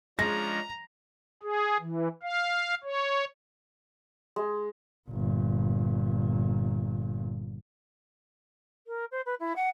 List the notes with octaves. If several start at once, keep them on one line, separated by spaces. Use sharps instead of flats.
F3 G#3 C#4 D4 A#5 A#6
G#4
E3
F5
C#5
G#3
G1 A#2
A#4
C5
B4
E4
F#5